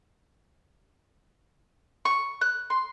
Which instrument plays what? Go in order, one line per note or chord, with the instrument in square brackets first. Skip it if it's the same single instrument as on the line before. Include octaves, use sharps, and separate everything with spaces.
[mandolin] C#6
F#6
C6